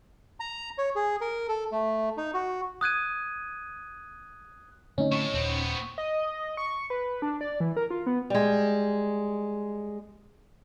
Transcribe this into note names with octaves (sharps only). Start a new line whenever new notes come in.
A#5
C#5
G#4
A#4
A4
A3
D#4
F#4
D#6 F#6 G#6 D#7
D3 A3 C4 C#4 D#4
A2 A4 C#6
D#1 B3 C4
D#5
C#6
B4
D4
D5
E3
A#4
F4
B3
G3 G#3